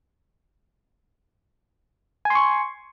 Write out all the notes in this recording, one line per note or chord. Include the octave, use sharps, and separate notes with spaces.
G#5 C6 C#6